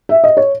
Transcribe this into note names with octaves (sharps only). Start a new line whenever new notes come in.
E5
D#5
C#5